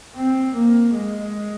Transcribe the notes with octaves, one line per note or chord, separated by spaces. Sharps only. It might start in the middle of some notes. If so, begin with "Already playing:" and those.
C4
A#3
G#3